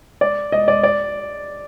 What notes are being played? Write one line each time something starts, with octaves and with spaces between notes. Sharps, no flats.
D5
D#5
D5
D5